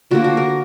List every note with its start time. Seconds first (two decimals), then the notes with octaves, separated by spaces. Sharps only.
0.11 D3 F3 A#3 F#4
0.24 F#4
0.37 A#4